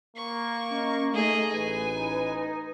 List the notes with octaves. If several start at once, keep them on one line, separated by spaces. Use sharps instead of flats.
A#3 C#6
C#4 D#5
A3 D#4 G#4 D#5
A1 B4 G#5
D#4